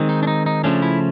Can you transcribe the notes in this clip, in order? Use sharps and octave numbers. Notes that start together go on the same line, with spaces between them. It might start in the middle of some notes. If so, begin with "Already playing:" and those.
Already playing: D#3 G#3 C4
D#4
D4
D#4
D#4
C#3 F3 A3 C#4 D4
E4